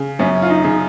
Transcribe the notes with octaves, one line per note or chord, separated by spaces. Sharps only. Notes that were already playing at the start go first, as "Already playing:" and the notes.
Already playing: C#3
F#2 C#4
F4
D#4
C#3